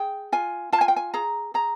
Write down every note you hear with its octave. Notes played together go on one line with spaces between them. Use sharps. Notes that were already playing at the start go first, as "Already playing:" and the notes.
Already playing: G#4 G5
F4 G#5
F4 A5
G#5
G5
G#5
G#4 A#5
G#4 A#5